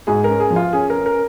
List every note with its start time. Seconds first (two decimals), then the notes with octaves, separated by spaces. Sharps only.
0.07 G#2 G#4
0.24 C#4 A#4
0.40 G#4
0.50 F3
0.56 F4
0.73 C#4 G#4
0.90 A#4
0.95 C#4
1.06 A#4